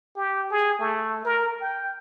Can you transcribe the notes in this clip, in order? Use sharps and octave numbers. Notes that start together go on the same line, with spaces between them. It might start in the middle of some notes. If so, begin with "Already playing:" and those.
G4
G#4
A3
A#4
G5